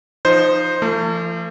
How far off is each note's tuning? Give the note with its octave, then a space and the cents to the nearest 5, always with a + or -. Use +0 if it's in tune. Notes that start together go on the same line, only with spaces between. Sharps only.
F3 -10 D#4 +0 C5 +0
F3 -35 A3 +40